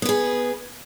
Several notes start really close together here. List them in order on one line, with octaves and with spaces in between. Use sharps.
B3 B4 G#4